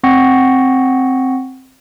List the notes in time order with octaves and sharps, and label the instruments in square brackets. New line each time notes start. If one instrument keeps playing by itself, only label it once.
[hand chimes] C4 F#5 G5 C#6 A#6 C#7